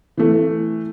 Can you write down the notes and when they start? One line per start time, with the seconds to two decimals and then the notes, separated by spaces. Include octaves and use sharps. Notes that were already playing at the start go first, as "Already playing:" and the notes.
0.17 E3 A3